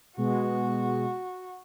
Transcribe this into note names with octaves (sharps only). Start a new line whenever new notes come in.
B2 G#3 F#4